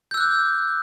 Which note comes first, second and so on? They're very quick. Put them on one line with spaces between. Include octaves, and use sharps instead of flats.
G6 E6 F#6 D6